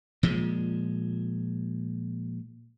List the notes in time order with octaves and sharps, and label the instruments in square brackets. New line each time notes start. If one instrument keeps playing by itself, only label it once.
[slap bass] A#2 F3 G#3